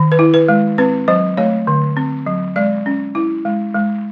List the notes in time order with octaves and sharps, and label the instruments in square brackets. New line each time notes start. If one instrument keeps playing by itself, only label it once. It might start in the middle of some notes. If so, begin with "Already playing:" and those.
Already playing: [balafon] D#3
B4
E4
B4
G#3
C4 B4
F#3 C5
A3 C#5
D3
C4
F#3
G#3 D5
C#4
E4
G#3
G#3